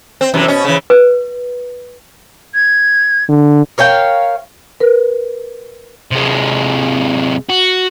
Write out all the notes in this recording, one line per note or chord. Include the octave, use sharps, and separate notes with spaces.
C4
F#2 C3 E3
B2 C#4
C#3 E3
B4
G#6
D3
A#4 C#5 F5 G5
A#4 B4
C3 G#3
F#4